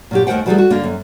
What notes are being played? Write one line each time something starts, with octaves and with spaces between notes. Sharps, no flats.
A#2 F#3 G4
D#2 A3 A#4 C5 F#5 G5
E3 F#3 G3 A3 G#4 A4
F#4
D3 A#3
F#2